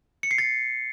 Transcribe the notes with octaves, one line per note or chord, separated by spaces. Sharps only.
C#7
C7
A6